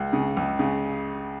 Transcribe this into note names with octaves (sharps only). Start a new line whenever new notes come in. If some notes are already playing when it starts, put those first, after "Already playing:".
Already playing: C#2
C#3
C#2
C#3